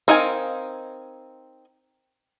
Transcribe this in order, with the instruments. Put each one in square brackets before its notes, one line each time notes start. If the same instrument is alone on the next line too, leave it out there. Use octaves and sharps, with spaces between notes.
[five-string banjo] C4 D#4 A#4 F5 G#5